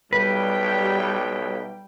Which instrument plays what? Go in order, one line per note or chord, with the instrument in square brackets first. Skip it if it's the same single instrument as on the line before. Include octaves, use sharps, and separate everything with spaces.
[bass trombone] B1 [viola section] G3 G5 [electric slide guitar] B4